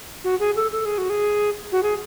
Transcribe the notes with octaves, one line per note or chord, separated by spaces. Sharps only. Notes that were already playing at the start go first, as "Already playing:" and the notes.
F#4
G#4
A4
A4
G#4
F#4
G#4
F#4
G#4